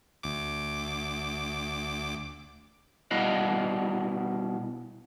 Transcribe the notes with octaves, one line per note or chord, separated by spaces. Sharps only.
D2 D6
B2 G3 E4 D#5 F5 F#5